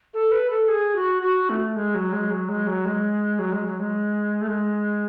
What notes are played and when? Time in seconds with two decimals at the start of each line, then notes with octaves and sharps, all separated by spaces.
0.14 A4
0.32 B4
0.50 A4
0.68 G#4
0.96 F#4
1.22 F#4
1.50 A3
1.76 G#3
1.95 F#3
2.13 G#3
2.31 F#3
2.49 G#3
2.67 F#3
2.85 G#3
3.39 F#3
3.52 G#3
3.66 F#3
3.80 G#3
4.41 A3
4.48 G#3